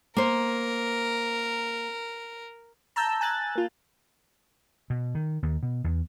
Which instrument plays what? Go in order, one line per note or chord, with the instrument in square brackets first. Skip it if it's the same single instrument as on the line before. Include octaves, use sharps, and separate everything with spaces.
[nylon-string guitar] A#3 C5 [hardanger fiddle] A#4
[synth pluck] A5 A#5 E6 G6
G#5 F#6 A6
A#3 F4
[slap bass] B2
D#3
D#2
B2
E2